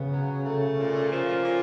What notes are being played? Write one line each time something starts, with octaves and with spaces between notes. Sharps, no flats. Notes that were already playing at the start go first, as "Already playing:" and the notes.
Already playing: C#3 B3
F#3
A3
A#2
F3
A#2